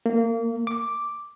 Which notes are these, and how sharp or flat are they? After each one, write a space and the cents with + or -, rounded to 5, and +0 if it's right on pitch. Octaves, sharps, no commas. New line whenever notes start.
A#3 -25
D6 +0